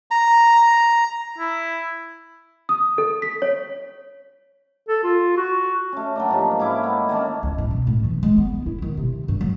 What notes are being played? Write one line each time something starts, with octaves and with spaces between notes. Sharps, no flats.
A#5
E4
D#6
A4
B6
C#5
A4
F4
F#4
A3 C#4
F#3 A#3 D4
G#2 F3 G4
G#2 C#4 E4 D6
A3 B3
D#3 A#3 C#4 D4
C#2
A1
B2
A2
E3
G#3
B3
E4
D#3
C3
G2
F#3